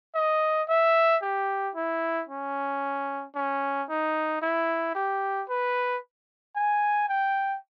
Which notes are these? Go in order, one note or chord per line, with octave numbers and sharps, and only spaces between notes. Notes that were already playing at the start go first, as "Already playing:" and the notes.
D#5
E5
G4
E4
C#4
C#4
D#4
E4
G4
B4
G#5
G5